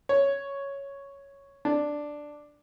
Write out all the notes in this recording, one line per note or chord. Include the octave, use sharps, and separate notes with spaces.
C#5
D4